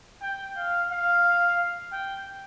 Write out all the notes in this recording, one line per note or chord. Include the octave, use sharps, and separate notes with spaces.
G5
F5
F5
G5